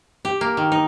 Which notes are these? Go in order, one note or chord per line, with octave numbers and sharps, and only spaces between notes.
G4
A#3
D#3
D#4